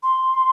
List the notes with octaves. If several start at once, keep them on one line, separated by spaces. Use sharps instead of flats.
C6